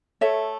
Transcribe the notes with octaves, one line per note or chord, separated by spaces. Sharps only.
A3 A4 C#5 E5